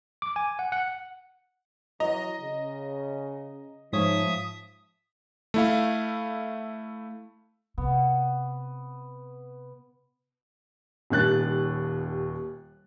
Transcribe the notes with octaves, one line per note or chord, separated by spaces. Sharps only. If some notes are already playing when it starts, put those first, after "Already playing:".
D6
G#5
F#5
F#5
E3 F#3 D#5 A#5
C#3
G#2 F3 C#5 E5 D#6
A3 E4 F5
C3 B3
D#1 D#2 F#6 A6